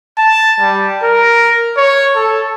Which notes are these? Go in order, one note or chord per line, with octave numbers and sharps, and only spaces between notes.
A5
G3
A#4
C#5
A4